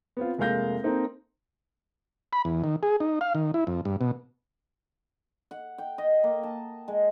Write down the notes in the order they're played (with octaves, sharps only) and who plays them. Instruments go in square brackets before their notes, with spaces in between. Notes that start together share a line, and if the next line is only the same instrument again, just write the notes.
[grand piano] B3 C4 F4
F1 G#3 A#3 F5 G6 A#6
A#3 C4 D#4 A4
[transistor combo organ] B5
E2
D#3
G#4
D#4
F5
D#3
E4
F2
G2
B2
[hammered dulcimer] F#5
G5
D#5
A#3
A5
G#3